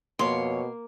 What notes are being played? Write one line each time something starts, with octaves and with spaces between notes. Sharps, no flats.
F2 B2 A#3 C#5 C6